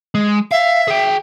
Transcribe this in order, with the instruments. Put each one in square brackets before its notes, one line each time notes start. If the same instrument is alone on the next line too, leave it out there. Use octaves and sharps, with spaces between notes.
[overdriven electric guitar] G#3
[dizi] E5 [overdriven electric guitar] F5
[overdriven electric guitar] G#4 G5